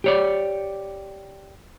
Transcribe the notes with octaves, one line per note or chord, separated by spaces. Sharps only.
G4 C#5 D5